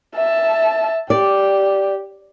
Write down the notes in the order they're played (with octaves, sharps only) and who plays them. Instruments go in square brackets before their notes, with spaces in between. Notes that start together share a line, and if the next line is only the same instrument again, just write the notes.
[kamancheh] E5 A5
[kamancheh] G4 [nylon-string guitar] D5